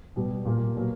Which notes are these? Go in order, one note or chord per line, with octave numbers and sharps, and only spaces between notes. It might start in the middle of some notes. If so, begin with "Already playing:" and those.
B2 G3 B3
A#2 G3 A#3
B2 F#3 A#3